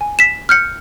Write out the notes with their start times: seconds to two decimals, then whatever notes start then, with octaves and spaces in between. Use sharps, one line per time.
0.01 G#5
0.19 B6 E7
0.49 F6 G6 C#7